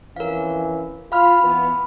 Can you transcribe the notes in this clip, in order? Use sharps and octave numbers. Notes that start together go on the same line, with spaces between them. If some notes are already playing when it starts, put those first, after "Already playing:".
F2 E3 C#4 A#4 F5
F4 F5 B5 F6
E3 B3